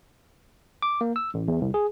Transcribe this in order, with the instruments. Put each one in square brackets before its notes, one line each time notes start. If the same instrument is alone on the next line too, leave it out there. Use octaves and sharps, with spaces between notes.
[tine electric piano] D6
A#3
E6
A1
E2
C2
G#4